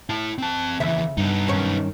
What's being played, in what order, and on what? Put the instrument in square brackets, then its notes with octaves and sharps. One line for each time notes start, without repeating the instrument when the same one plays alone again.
[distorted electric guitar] E4 A5
C4 A5
[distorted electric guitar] D#2 E3 [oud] C#3 E5
[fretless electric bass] G2 [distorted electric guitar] B3 D#4
[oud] F#2 D#3 C#4